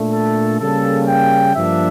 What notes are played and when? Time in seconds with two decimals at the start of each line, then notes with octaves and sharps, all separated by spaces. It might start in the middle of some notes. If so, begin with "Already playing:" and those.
Already playing: A#2 A3 D4
0.14 A4
0.60 C#3 G3 A#3 A4
1.08 G5
1.56 G2 F3 A#3 D4 E5